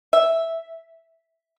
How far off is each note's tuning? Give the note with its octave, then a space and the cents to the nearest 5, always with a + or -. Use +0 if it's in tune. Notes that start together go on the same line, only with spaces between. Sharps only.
E5 -5